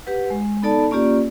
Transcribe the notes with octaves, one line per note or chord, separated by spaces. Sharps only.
G4 B4 F#5
G#3
B3 D#4 A4 D5 A5 B5
A#3 C#4 F4 G4 D5